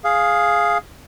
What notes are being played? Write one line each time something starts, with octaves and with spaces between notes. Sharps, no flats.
G#4 F5